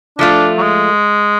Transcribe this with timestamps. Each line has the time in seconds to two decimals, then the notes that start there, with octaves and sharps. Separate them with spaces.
0.19 F3 A3 D4 F4
0.58 F#3
0.62 G#3